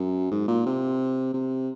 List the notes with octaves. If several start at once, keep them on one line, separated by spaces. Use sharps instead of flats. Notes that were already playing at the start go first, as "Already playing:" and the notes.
Already playing: F#2
G#2
A#2
C3
C3